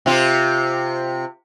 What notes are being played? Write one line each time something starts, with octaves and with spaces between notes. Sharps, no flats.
C3 F4